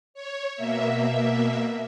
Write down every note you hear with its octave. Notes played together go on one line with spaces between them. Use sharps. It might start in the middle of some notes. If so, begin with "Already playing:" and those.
C#5
B2 A#3 E5